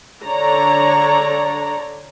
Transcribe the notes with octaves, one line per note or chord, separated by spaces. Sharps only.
D3 C#5 D5 A#5